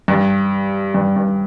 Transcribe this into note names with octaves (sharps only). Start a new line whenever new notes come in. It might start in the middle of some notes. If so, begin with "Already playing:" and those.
G2
G2
G2